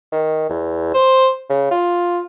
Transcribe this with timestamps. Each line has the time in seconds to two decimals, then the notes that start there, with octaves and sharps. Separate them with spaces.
0.12 D#3
0.49 E2
0.94 C5
1.50 C#3
1.71 F4